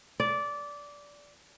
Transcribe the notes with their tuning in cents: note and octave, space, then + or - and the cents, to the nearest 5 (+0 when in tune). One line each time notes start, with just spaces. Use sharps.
D5 -15